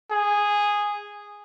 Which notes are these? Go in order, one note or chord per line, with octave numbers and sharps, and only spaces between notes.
G#4